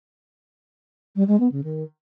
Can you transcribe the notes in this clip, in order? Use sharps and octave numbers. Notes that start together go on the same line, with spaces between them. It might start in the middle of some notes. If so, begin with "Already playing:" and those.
G3
G#3
B3
C#3
D#3